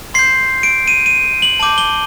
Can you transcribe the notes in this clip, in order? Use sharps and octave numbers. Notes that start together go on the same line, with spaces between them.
C6 G6 C7
D7
D#7
D#7
F#7
A5 D6 G6 F#7
G7